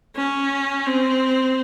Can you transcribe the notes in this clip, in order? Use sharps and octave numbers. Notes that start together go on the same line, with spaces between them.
C#4
C4